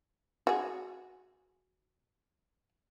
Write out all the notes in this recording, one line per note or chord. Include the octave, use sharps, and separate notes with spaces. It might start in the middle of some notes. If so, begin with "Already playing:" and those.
F#4 G#4